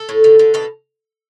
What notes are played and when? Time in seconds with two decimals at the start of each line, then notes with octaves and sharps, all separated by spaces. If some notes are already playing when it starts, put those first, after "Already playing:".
Already playing: A4
0.09 A2
0.24 D3
0.39 D3
0.54 B2 A4